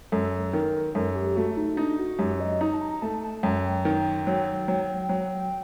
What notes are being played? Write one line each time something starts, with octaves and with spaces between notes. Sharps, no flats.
F#2 A4
D#3 A#4
F#2 A4
G4
A3 F#4
D#4
D4 D#4
F#4
F#2 G4
D#5
D#4 A#5
A5
A#5
A3 A5
A5
F#2 G5
D#3
F#3
F#3
F#3